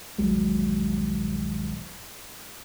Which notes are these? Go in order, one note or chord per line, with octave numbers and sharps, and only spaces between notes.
D#1 A#1 F#3 G#3